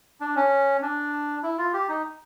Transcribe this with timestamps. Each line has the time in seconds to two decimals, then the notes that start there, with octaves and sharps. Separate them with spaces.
0.21 D4
0.36 C#4
0.82 D4
1.43 E4
1.58 F4
1.73 G4
1.88 D#4